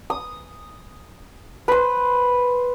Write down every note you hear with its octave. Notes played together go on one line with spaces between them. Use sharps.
D#6
B4 C5